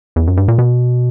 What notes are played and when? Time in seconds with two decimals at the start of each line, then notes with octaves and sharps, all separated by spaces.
0.16 E2
0.27 F#2
0.37 G2
0.48 A#2
0.59 B2